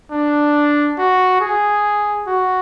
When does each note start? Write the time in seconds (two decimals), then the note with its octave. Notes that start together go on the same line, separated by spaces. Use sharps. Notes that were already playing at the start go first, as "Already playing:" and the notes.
0.12 D4
0.99 F#4
1.41 G#4
2.27 F#4